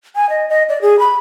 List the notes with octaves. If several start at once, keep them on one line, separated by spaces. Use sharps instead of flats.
G#5
D#5
D#5
D5
G#4
B5